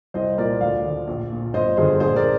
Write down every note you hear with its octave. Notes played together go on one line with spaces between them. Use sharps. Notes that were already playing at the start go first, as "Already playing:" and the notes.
C2 C5 D#5
A#2 F3 A#4 D5
D2 D5 F5
D3 F3
A#1
A#2 F3
G1 C5 D#5
G2 D3 F3 G#4 C5
A#1 G#4 C5
A#4 D5